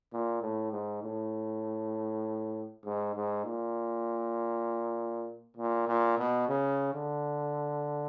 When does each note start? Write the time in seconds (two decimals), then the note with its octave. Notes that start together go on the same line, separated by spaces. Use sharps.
0.12 A#2
0.42 A2
0.72 G#2
1.03 A2
2.85 G#2
3.15 G#2
3.45 A#2
5.57 A#2
5.87 A#2
6.18 B2
6.48 C#3
6.93 D3